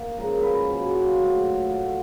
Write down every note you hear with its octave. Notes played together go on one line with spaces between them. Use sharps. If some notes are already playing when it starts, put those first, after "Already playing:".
Already playing: A#3
C#3 F3 G#3 A#4
B4
B2 F#3 A#3 G#4
F4
G#2 D#3 F#3 A3
A2 F#3 A3 F4